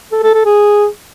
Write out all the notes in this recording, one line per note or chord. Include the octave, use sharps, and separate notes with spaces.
A4
A4
A4
G#4